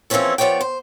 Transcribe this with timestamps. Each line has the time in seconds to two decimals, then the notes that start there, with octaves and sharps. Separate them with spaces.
0.10 E3 F3 A#3 C4 C#4 A4
0.38 F3 B3 C#5 D5 G5
0.61 C5